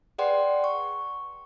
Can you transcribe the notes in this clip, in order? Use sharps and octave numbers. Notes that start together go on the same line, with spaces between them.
G#4 B4 D5 F#5 G5 C6
C#6